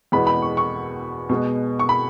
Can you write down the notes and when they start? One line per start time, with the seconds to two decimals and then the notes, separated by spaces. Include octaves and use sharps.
0.12 E2 B2 G#3 B3 B5
0.27 B5
0.42 C#6
0.57 C#6
1.29 B2 G#3 B3
1.79 C#6
1.89 B5